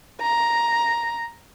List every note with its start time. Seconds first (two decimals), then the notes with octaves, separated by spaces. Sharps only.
0.21 A#5